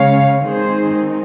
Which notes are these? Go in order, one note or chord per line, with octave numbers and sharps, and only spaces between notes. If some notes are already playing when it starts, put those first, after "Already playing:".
Already playing: C#3 G#3 C#4 C#5 F5
D#3 G#3 C4 D#4 G#4 C5